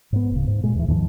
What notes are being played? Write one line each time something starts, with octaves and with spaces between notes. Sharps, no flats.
G#2 B3
D1 C#3
G#2
A#2 G#3
D#2 E3
D#2 G#2 D#3 F3